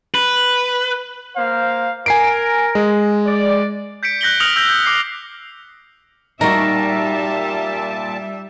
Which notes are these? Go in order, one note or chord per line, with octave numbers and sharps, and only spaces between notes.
B4
A#3 C5 F5
A#4 G#5 C7 D7
G#3
D5
G6 B6 C#7 D7
F#6 G6 A#6 B6 F#7 G7
D#6 F6 A#6 C#7 F7 F#7
E6 G6 A#6 G7
G6
D6 C7
A#2 G3 D#4 F#4 A#4 E5 A5